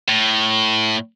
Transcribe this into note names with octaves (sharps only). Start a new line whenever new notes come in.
A2